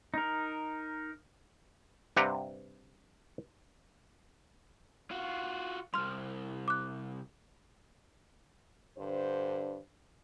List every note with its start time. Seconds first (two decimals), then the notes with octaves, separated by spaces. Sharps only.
0.14 D#4 A#4
2.16 G2 C3 G4 B4 F#5 A#5
5.11 F4 F#4
5.94 C2 G2 C6 F6
6.68 D6 F#6
8.97 G2 D3 C5